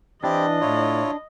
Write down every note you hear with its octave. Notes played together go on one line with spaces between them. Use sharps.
E3 C4 D4 E4 G4 D#5
A2 E4 F4 C#5